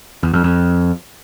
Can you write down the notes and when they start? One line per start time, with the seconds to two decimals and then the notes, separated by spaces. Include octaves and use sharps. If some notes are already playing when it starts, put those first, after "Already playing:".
0.23 E2
0.34 F2
0.44 F2